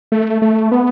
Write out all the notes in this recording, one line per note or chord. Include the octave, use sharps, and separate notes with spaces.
A3
A3
B3